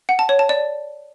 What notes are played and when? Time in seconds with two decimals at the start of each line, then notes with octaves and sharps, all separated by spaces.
0.09 F#5
0.19 A5
0.29 C#5
0.39 A5
0.49 D5